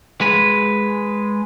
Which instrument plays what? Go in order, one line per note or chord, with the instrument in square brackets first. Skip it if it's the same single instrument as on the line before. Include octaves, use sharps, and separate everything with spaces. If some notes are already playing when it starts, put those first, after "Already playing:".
[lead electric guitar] G#3 B4